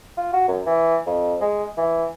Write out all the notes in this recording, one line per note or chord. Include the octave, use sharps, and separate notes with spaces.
F4
F#4
F#2
E3
F2
G#3
E3